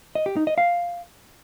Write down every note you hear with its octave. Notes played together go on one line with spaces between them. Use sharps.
D#5
G4
D#4
D#5
F5